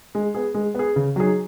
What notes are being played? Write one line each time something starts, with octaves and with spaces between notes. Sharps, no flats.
G#3
B3 G#4
G#3
B3 G#4
C#3
F#3 D#4 G#4